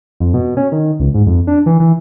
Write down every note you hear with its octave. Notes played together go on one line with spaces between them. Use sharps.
F2
B2
C#4
D#3
C#2
G#2
F2
D4
E3
E3